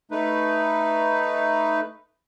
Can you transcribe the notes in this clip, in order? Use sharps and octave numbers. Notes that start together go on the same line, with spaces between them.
A3 D#4 B4